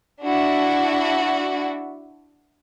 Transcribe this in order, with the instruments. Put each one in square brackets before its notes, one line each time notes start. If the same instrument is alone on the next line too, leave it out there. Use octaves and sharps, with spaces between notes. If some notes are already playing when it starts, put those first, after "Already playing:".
[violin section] D4 E4 F#4